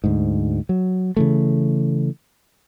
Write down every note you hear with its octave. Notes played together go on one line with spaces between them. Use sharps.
D2 G#2
F#3
C#3 E3 A3